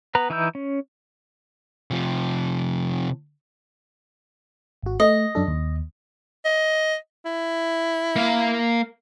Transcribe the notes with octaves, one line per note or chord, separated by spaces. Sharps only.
B3 B4 A#5
E3 D#4 E4 E6 G6
C#4
C3 F3
G#1 F#4
A3 D#5
F#2 D4 A4
D#2
D#5
E4
A#3 F5